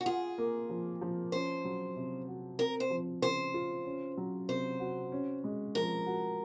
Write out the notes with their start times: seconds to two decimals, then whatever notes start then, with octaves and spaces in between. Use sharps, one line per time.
0.01 F#4
0.06 F4 G#4
0.38 A#3
0.69 F3
1.01 F3
1.32 C#4 C5
1.65 F#3
1.96 C3
2.28 F#4
2.58 C4 A#4
2.80 C5
2.90 F3
3.22 C#3 C5
3.54 F4
3.85 C#4
4.17 F#3
4.48 C3 C5
4.80 F#4
5.12 C#4
5.44 G#3
5.75 F3 A#4
6.06 F#4